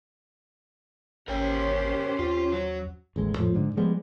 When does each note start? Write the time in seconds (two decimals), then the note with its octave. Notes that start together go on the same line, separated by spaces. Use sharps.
1.28 G#1 C#4 G4 A#4 C5 C#5 G5
2.19 D#2 F4
2.52 F#3
3.16 A1 D#2 G#3
3.38 F2 A2 F3
3.54 G#2 D3
3.77 F3 G3 G#3 B3